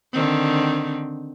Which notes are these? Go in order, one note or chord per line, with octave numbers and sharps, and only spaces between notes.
D3 D#3 C4